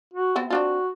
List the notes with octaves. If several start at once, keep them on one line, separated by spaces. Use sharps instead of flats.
F#4
B3 C4 E5
C4 D4 F4 F#4